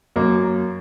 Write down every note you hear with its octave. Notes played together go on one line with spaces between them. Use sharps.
F#2 A#3